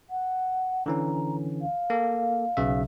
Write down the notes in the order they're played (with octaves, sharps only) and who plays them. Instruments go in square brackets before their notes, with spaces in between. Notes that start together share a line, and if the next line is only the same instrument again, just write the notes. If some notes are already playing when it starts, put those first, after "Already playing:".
[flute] F#5
[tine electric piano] D3 E3 C#4 [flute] A#5
[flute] F5
[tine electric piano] A#3 A4
B1 C#3 E5